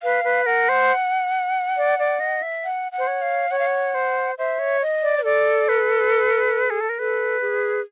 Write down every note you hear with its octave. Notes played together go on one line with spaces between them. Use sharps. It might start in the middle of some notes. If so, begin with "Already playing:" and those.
B4 F5
B4
A#4 F#5
C5
D5
D5
D#5
E5
F#5
F#5
C5
C#5
F5
C#5 F#5
F5
F#5
C5
C5 E5
C#5
D#5
D5
A4 D5
B4
G#4
A4
A#4
A4 B4
G#4